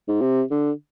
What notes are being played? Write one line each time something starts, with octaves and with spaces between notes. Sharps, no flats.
G#2
C3
D3